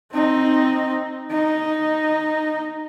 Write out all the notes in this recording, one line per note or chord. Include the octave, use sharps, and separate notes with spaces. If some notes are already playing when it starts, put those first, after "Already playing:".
C4 D#4
D#4